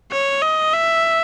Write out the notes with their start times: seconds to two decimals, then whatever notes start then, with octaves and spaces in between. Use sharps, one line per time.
0.12 C#5
0.42 D#5
0.73 E5